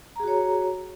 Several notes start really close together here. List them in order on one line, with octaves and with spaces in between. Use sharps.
A#5 G#4 F#4 C#5